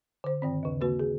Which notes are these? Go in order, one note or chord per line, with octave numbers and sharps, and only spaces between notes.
D3 C5
G2 D#3 C4
D#2 C#3
C#3 A#3 F#4 B4
G#4